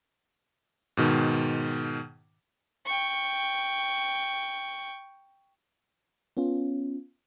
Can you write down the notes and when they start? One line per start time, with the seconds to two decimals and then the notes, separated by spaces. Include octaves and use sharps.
0.97 G#2 B2 D#3
2.86 G5 C#6
6.37 B3 C#4 F4